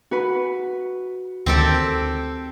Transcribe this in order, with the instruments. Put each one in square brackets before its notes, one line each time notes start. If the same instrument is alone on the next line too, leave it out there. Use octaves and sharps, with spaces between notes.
[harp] F#4 B4
[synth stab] D2 D#3 D7 [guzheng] C4 G4 A4